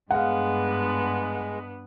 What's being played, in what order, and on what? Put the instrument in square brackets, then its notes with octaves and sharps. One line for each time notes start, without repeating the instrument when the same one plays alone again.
[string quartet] G2 B3 D4 [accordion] G#3 [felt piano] F5 F#5